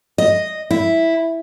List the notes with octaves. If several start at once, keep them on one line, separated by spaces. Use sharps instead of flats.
D#5
E4